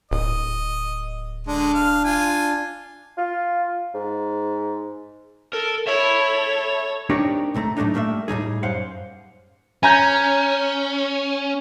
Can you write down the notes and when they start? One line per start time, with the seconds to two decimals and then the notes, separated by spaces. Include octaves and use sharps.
0.11 D1 D#5
1.47 D3 G#3 D4
1.74 F5
2.04 F4 G#5
3.18 F4
3.94 G#2
5.53 A4 A#4
5.87 A4 C#5 E5 B5
7.10 C4 D4 D#4 G4 A#4 C#5
7.54 C2 C3 A3 A#5
7.77 A2 F#3 A3 D4 D#4
7.94 G3 A3 A#3 D#5 E5
8.28 A2 G3 D#4 G#4
8.63 F#2 C5 F5 F#5
9.83 C#4 G#5 A#5 G6